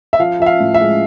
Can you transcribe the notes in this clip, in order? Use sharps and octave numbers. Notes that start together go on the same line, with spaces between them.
E5
F3 F5
F3 E5
F5
A2
E5
G#3